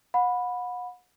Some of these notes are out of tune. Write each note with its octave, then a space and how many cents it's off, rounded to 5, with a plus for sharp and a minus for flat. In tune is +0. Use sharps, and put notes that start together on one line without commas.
F#5 -35 B5 +0